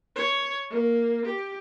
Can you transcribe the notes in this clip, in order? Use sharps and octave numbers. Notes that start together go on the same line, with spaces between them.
C#5
A#3
G4